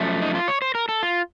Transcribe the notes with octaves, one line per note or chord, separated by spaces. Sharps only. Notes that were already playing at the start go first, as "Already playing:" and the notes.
Already playing: F#2 F3 A3
D#4
F4
C#5
C5
A#4
A4
F4